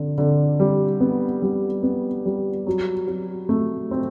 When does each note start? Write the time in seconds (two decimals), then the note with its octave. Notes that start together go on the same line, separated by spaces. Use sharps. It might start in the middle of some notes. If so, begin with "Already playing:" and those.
Already playing: D3
0.18 D3
0.60 G3
1.00 B3
1.42 G3
1.83 B3
2.26 G3
2.67 F#3
3.08 F#3
3.49 A3
3.91 C4